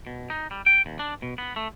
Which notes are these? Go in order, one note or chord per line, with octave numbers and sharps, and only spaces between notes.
B2
D#4
G3
G5
D#2
D4
B2
B3
A3